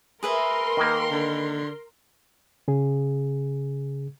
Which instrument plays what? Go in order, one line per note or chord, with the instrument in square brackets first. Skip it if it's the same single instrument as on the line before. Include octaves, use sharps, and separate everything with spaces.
[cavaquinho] G#4 B4 E5 [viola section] A#4 C6
[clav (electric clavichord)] D#3 A#3
[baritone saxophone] D3
[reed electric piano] C#3 G#4